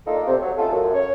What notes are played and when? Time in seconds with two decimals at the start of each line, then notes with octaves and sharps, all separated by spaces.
0.07 A3 A#3 D4 D#4 F4 A4
0.27 C3
0.41 F#3
0.58 C#3 A3 D#4 F4 A4
0.72 F#2
0.94 C#5